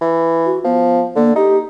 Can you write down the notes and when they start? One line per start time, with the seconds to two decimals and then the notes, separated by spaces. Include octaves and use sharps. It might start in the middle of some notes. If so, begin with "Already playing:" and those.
0.01 E3
0.46 F#4
0.65 F3 B3
1.16 D3 A#3
1.36 D#4 G4